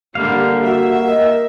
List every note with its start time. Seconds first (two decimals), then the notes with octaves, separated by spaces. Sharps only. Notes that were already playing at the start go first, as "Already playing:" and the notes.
0.15 D3 G3 A#3 G4 F5
0.63 F#4 E5 F#5
1.06 A#4 D#5